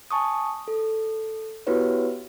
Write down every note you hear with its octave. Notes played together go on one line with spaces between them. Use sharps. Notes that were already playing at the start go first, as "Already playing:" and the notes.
G#5 A5 C#6 D#6
A4
B3 E4 F#4 G4 B4 C#5